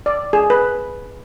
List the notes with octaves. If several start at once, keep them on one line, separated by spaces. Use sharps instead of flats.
D5
G#4
B4